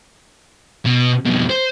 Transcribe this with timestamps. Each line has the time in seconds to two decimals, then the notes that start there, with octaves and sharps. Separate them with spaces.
0.85 B2
1.25 F2 B2
1.50 C5